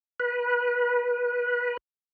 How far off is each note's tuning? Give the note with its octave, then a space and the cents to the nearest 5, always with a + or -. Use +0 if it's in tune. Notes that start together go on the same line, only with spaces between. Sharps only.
B4 -25